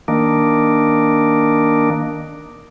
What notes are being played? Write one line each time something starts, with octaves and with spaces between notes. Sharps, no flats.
D#3 A#3 D4